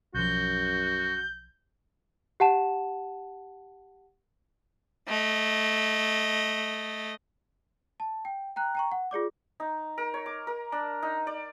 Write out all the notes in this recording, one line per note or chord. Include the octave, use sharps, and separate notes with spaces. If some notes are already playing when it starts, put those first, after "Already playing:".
B1 F#2 F3 F#4 G6
G4 F#5 A5 E7
A3 D#5
A5
G5
G5 A#5 F#6
G5 A#5 C#6
F#5
F4 G#4 D5 D6
D#4
A#4
C#5
D6
A#4
D4
D#4
D5